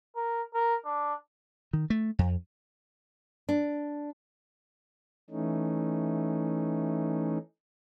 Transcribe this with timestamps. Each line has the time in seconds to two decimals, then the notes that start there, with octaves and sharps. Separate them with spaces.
0.16 A#4
0.54 A#4
0.85 D4
1.73 D#3
1.90 A3
2.19 F2
3.49 D4
5.30 E3 A3 C#4 D#4